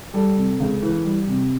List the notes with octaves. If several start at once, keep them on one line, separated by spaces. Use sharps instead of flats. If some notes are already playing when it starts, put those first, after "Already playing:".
G3 A4
C3
C#2
E3
G3
C3